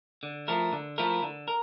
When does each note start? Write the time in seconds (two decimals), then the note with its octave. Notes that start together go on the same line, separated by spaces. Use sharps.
0.23 D3
0.48 F3 A3 E4 A#4
0.73 D3
0.98 F3 A3 E4 A#4
1.23 D3
1.48 A#4